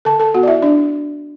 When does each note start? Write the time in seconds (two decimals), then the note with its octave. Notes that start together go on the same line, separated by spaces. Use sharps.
0.05 D3 A4 A5
0.20 A4 A5
0.34 B3 F#4 F#5
0.43 D5
0.48 E4 E5
0.62 D4 D5